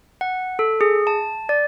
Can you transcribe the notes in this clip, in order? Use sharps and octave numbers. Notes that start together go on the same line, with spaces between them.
F#5
A4
G#4
A5
D5